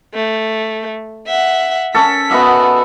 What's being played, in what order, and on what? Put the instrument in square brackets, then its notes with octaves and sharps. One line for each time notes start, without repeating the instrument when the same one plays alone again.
[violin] A3
E5 F#5
[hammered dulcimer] C#4 A4 [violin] B6
[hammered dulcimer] B3 D#5 E5 [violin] F#4